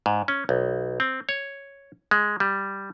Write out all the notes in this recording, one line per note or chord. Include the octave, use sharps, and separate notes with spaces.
G#2
C#4
B1
C4
C#5
G#3
G3